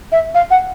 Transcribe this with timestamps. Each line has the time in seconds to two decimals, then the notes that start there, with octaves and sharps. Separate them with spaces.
0.12 E5
0.34 F5
0.51 F#5